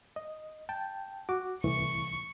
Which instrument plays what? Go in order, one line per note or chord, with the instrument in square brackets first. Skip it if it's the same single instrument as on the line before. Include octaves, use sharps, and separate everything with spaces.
[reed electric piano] D#5
G5 A5
F#4 D6
[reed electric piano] C2 A2 E3 [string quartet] C#6